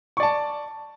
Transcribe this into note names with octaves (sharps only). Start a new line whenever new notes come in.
D5 A5 C#6